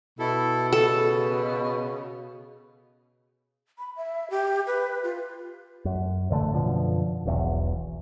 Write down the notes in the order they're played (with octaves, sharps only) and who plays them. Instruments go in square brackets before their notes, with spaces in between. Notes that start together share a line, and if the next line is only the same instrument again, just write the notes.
[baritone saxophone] B2 [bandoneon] E4 A4
[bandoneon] C#3 [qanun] A4
[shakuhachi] B5
E5
G4
B4
F4
[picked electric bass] F#2
A1 D3 E3 A3
F#2 B2 D3 F3
E1 B1 E2